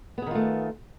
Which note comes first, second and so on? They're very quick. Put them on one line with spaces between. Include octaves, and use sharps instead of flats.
B3 G#4 D#3 F4 A3